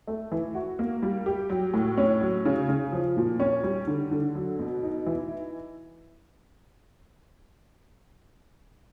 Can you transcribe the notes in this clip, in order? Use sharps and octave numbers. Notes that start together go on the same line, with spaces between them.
A3
E3
F#4
A#3
G3
G4
F#3
A2
C#4
F#3
C#3
C#3
F3
A#2
C#4
G3
D3
D3
F#3
B2
D#4
E3